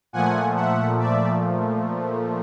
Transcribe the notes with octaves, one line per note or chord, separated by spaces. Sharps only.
A#2 F3 A3 F#5 G#5
E5 F#5
D5 E5